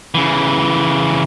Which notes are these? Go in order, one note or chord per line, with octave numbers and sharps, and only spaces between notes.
C#3 E3